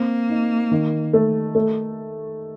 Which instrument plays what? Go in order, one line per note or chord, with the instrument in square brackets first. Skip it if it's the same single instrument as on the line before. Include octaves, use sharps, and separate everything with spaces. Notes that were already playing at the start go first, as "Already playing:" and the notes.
Already playing: [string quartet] A#3 [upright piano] C4
[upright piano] D#4
D#3
A3
A3